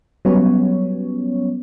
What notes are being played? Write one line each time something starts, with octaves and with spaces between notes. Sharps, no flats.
F#3 G3 B3 C#4 C#5